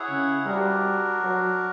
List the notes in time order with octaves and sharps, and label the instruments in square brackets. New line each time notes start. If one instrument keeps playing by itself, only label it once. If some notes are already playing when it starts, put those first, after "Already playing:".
Already playing: [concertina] E4 G#4 C#5 F#5
[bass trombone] C#3
[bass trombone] G3 [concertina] D4 F#4 A#4
[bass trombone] F#3